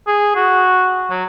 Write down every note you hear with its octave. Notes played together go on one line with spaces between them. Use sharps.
G#4
F#4
F#3